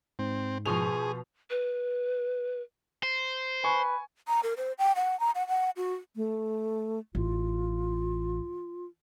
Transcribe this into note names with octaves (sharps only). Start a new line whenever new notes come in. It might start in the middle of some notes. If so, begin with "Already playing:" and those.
G#2 C4
B2 F3 G#4 C6 C#6 D#6 F7
B4
C5
B4 G#5 C#6
A#5
A#4
C5
G5
F#5
A#5
F#5
F#5
F#4
A3
A1 F4